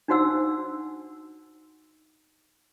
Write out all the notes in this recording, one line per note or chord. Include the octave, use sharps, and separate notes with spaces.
D4 D#4 F#4 C5 F#5 E6